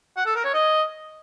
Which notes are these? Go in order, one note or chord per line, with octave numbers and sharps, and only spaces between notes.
F#5
A4
A#4
C#5
D#5